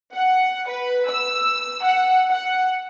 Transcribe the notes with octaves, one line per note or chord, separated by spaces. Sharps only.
F#5
B4
E6
F#5
F#5